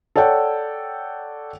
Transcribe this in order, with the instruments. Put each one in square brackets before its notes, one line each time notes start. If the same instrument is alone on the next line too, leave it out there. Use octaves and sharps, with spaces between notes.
[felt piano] A4 C#5 D5 F#5 G5